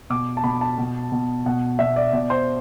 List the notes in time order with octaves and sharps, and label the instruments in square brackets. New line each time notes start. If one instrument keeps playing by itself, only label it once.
[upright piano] B2 D6
A5
B2 B5
A5
B2
B2
B2 F#5
B2 E5
D5
B2 D5
C5